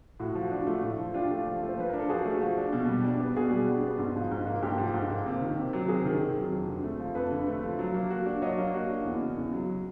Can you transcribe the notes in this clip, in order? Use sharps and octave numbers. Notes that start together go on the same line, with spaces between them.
A2 F#4
F3
F#4
D4
F4
A3
A2
F3
D4 F4 G4
A3
F3
A3
C5
F3 B4
D4 A#4
A4
F3 F#4 G#4
A3
F3
D4
B2
G3
D4
B3
B2 F#4 G#4
G3
D4
B3
G#2
F3
G#2
A#3
A#4
G#2 G4 A4
F3
G#2
A#3
C3
D#3
C3
F#3
C3 G#4 A#4
D#3
C3
F#3
F2
D3
A3
F3
F2 A4 B4
D3
A3
F3
F#3
A#3
F#4
D4
F#3 C#5 D#5
A#3
F#4
D4
E2
C#3
E2
F#3